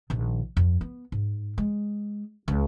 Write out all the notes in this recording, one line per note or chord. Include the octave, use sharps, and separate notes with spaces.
A#1 D#3
F2
B3
G#2
G#3
C#2